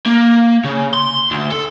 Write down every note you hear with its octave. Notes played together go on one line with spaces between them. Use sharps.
A#3
C#3
C6
D2
A4